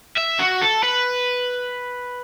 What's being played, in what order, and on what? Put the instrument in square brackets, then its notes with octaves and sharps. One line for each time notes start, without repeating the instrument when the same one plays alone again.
[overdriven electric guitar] E5
F#4
A4
B4